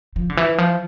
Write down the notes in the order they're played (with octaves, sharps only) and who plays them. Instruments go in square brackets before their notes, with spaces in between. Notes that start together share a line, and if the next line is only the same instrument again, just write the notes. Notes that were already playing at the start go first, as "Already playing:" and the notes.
[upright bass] F3
D3
E3
F3